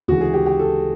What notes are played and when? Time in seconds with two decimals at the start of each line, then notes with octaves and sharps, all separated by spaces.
0.08 D2 C#3 E3 G#3 F#4
0.21 G#4
0.34 G4
0.46 G4
0.59 A4